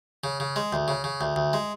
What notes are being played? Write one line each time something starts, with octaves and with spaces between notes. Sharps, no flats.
C#3
C#3
G#3
D2
C#3
C#3
D2
D2
G#3